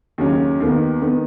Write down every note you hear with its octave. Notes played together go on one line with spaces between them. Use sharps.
D#2 C#3 F#3 C#4
D#2 D#3 B3
D#3 B3